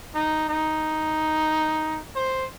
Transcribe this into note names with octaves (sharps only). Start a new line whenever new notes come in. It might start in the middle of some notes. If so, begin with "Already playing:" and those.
D#4
D#4
C5